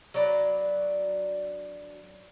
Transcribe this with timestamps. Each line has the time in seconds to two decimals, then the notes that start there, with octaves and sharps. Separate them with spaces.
0.14 F#3 D4 B4